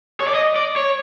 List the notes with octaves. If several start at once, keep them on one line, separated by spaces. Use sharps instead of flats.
C#5
D5
D#5
D5
C#5